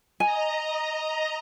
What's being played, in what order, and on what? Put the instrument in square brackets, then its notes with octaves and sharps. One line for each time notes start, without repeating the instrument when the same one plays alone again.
[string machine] D#5 A#5 [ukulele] G#5